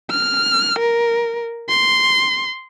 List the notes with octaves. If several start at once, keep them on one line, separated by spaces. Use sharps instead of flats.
F6
A#4
C6